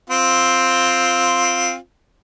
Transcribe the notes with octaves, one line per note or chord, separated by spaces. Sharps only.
C4 F4